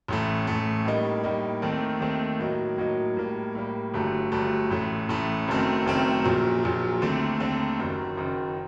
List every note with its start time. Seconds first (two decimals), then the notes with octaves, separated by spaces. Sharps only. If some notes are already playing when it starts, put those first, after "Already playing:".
0.08 A1 A2 A3
0.47 A1 A2 A3
0.85 A2 G3 A#3 D#4
1.24 A2 G3 A#3 D#4
1.62 D#2 D#3 A3 C4
2.00 D#2 D#3 A3 C4
2.39 A2 F#3 A#3 D#4
2.78 A2 F#3 A#3 D#4
3.17 A2 G3 A#3
3.55 A2 G3 A#3
3.94 G1 G2 F#3 A3
4.32 G1 G2 F#3 A3
4.71 A1 A2 A3
5.09 A1 A2 A3
5.47 F#1 F#2 D#3 A3 C4
5.86 F#1 F#2 D#3 A3 C4
6.24 A#1 A#2 F#3
6.63 A#1 A#2 F#3
7.02 D#2 D3 A3 C4
7.40 D#2 D3 A3 C4
7.79 F#1 F#2 D#3
8.17 F#1 F#2 D#3